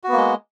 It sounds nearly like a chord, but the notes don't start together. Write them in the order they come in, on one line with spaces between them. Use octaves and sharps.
F#4 B3 A#3 G#3